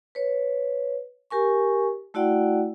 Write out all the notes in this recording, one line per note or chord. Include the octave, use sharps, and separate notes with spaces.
B4 C#5
G4 A#4 G#5 C#6
A3 E4 F#4 D5 F#5 G5